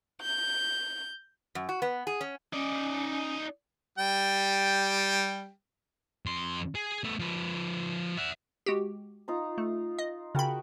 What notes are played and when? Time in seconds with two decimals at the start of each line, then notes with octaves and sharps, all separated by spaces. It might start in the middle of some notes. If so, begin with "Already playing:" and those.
0.21 G6
1.55 F#2
1.69 F#4
1.82 B3
2.07 G#4
2.21 C#4
2.53 C#4 D#4 D5
3.98 G3 G5
6.26 F2 C6
6.75 G#4
7.04 A3 B3
7.19 F3 B4
8.17 E5 F#5
8.66 G#3 F#4 G4
9.28 D#4 F4 A#5
9.58 A3
9.99 D#5
10.35 C#3 F#4 A#4 G5 B5